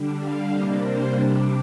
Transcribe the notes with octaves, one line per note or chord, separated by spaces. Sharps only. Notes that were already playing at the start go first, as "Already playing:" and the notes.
Already playing: D3 G3 D4
F5
C3 G3 A#3 D4 D#5
C5
C3 G3 D4